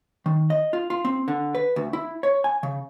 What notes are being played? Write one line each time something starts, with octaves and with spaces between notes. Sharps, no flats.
D#3
D#5
F4
F4
C4
D3
B4
D2
E4
C#5
G#5
C#3